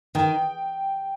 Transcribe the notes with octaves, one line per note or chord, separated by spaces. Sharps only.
D#3 G5